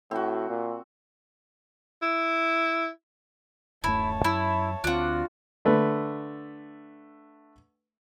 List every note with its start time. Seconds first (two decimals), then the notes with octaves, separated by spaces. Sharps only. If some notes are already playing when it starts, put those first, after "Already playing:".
0.11 A2 C4 F#4
0.50 A#2
2.02 E4
3.84 D1 F#2 A3 E4 C#5 A5
4.24 F#2 E4
4.84 D2 C4 D4 F4 F#4
5.65 D3 A3 B4